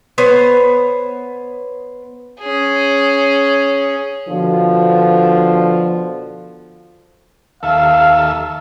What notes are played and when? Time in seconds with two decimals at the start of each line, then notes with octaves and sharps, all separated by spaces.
0.18 B3 C5 C#5
2.40 C#4 G#4
4.28 B2 D3 F3
7.63 D#2 A4 E5 F5